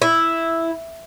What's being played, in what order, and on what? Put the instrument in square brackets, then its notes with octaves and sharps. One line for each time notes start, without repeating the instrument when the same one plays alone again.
[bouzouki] E4